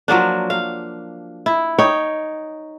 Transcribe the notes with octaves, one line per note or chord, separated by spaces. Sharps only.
F3 F#3 A#3 D4
F5
E4
D#4 C#5 G5